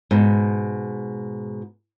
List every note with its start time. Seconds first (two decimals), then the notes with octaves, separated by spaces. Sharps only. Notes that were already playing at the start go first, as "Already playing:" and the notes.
0.11 G#2 B2